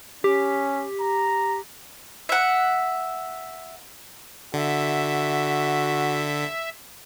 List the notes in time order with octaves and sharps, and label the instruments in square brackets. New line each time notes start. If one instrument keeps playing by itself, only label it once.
[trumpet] C#4 [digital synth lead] G4
[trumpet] A#5
[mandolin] E5 F#5
[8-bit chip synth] D3 [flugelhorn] F#4 [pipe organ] E5